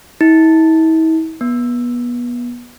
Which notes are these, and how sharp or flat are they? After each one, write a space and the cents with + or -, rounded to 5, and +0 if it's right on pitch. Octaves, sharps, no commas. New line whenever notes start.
E4 -45
B3 -30